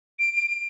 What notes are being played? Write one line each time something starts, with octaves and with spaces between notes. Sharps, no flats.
D7
D7
D7